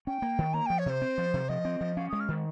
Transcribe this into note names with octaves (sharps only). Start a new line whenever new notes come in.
C#4 G5
A#3
D#3
A#3 A#5
F3 G5
C#5
C3 C5
C4
F3
C3
F3 D#5
C4
F3
C#4 F5
G#3 D#6
F6
D#3